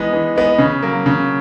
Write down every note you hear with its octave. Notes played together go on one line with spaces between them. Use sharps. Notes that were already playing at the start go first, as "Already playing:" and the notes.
Already playing: E3 G#3 B3 D#4
E3
G#3 B3 D#4
C#3
F#3 A#3
C#3